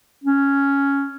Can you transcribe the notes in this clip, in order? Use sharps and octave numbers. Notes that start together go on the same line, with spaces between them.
C#4